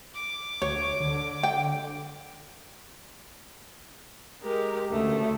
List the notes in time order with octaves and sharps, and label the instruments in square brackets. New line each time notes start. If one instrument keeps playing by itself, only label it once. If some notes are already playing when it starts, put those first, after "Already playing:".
[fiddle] D6
[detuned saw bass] D2 [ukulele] C#5
[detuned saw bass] D3
[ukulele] G5
[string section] G#3 [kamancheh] G4 A#4
[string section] D2 C#3 [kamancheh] A3